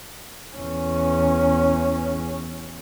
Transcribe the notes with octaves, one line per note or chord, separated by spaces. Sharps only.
E2 C#4